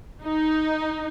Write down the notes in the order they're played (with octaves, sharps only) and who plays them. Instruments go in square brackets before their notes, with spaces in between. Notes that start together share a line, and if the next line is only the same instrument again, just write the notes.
[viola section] D#4